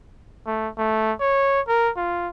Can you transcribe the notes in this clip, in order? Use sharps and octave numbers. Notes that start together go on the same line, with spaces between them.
A3
A3
C#5
A#4
F4